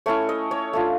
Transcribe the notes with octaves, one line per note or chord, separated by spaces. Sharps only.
A3 C#4 E4 C#5
D#5
C#5
A3 D4 F4